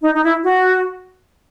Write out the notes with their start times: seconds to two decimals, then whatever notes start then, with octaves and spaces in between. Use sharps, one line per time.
0.04 D#4
0.14 D#4
0.23 E4
0.44 F#4